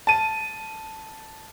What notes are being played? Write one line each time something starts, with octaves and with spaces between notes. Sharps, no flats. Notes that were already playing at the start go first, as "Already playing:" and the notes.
A5 D#7